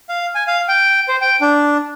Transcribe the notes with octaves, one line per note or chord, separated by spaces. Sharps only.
F5
G#5
F5
G5
C5
G5
D4